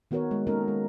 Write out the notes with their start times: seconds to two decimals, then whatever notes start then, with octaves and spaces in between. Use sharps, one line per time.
0.11 D#3 B3 F#4 A#4 C#5
0.31 G#3
0.47 A#3 C#4 D#4 A4 A#4
0.68 G#3